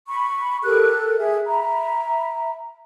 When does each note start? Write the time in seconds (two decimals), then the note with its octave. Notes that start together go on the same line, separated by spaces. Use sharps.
0.08 B5 C#6
0.63 G4 A4 A#4 F#6
1.18 G#4 E5
1.47 E5 A#5 B5